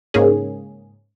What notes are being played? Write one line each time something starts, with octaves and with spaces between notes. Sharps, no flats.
G#2 C#3 A#3 C#4 G#4